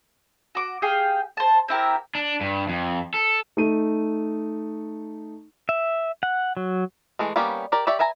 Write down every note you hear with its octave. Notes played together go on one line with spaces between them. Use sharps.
F#4 D6
G4 G#4 F5 G5
C5 A5
C4 E4 G4 A#4
D4
G2
F2
A4
A3 D#4 D#7
E5
F#5
F#3
E3 G#3 A3
G3 A#3 B3 C#4 G4
G4 A#4 D5
G4 C#5 D5 E5
B4 E5 G#5 A#5